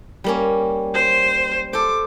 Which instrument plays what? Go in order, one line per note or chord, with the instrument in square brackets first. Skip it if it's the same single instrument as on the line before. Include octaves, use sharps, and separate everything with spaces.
[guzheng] G3 A#3 C#4
[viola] C5
[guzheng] A4 C5 [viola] D6